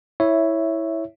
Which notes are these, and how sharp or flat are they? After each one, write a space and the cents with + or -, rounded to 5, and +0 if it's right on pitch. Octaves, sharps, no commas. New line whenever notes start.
E4 -10 C#5 +0 E5 +0